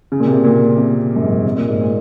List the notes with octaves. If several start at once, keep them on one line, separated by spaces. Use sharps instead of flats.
C#3
A#2
C3
A#2
C3
F#2
G#2
C3
A#2
G#2
A#2